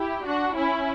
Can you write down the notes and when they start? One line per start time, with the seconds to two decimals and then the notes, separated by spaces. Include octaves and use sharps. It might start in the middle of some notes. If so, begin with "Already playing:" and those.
Already playing: E4 G4
0.25 D4 F#4
0.55 C#4 E4